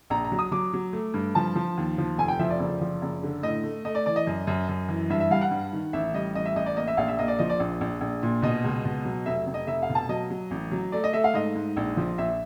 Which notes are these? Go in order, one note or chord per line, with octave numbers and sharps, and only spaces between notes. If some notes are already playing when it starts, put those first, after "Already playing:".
A#1 A#5
A#5
F#3
D#6
F#3 D6
F#3
A3
G2
F3 A5
F3
D#2
F3
F1 G#5
G5
F3 E5
D5
F#1
F3
F#1
D3
A2 D#5
A3
A3 D#5
D5
E3 D5
D#5
F#2
F#2
F#2
E3
G2 E5
E5
G3 F5
F#5
G2
D#3
A1 E5
G3 D#5
A1 D#5
E5
A1 D#5
D5
A#3 D#5
E5
A#1 F5
E5
A#3 D#5
D5
F3 D#5
D5
A#1
A#1
A#1
A#2
B2 D#5
C#2
B2
F#3
F1 E5
F1
D#5
F1 E5
F5
B2
A5
F#3 D#5
F#3
A1
F#3
A3 D5
D#5
A3 E5
F5
G#2 D#5
G#2
A#1
F3
A#1 E5